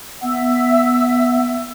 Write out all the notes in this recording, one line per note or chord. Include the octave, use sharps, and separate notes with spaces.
B3 E5 E6